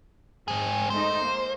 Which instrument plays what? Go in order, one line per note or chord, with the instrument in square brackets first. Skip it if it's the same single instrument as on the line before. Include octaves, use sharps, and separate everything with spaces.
[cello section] G#2 [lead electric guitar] C4 G#4
[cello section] G#3 A3 D#4 [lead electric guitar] C5
[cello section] A#3